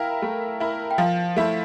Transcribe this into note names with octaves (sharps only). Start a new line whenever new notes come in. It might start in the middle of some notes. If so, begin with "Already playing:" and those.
Already playing: E4 A#4 F5 G5
A3
E4 A#4
G5
F3 F5
A3 E4